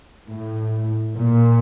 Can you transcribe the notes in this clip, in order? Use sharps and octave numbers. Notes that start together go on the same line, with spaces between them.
A2
A#2